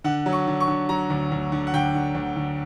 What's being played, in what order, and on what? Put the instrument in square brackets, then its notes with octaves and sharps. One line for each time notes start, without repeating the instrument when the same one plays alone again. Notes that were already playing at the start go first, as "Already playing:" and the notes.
[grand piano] D3 F#5
F#3
C#6
D3
C#6
D3
F#3 A#5
D2
D2
D3
F#5
D2 G5
D3
D2
D3